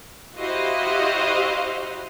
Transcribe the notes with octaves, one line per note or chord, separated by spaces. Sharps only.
E4 F#4 G4 C5 D#5 F5